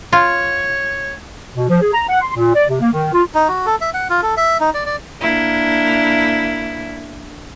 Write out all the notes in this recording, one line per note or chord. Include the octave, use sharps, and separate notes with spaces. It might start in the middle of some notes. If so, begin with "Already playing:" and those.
F4 C#5
B2
F3
G#4
A#5
F#5
C6
A#2
D5
C3
A#3
D#3
F4
D#4
F#4
A4
E5
F#5
F4
A4
E5
D#4
D5
D5
A#3 D4 E4